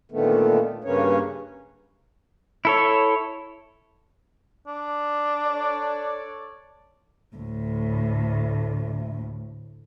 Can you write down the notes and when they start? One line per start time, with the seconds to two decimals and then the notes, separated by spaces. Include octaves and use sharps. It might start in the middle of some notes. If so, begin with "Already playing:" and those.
0.12 A#2 D3 D#3 A3 B3
0.84 G2 C#3 A#3 B3 C#4 C#5
2.65 E4 A4 C#5
4.67 D4
5.47 A4 C#5 D5
7.37 D2 A2